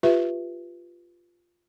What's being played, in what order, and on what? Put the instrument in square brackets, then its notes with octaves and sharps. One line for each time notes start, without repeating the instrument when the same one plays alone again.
[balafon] F4 G4 B4 E5